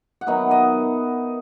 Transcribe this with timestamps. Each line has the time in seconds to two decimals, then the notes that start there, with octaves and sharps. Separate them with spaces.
0.21 F#5
0.27 D#3 F#3 B3 D#4 E5
0.51 D#5